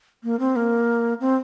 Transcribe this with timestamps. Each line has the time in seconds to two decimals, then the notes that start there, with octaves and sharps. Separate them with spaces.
0.24 A#3
0.40 C4
0.56 A#3
1.20 C4